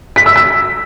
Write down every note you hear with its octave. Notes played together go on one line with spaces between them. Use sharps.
B6
E6
B6